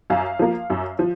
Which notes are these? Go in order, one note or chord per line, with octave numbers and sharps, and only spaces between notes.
F#2 F5
F3 A#3
F#2
F3